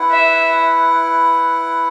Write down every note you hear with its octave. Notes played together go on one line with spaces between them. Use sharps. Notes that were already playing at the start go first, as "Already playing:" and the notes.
Already playing: E4 B4 F#5
E5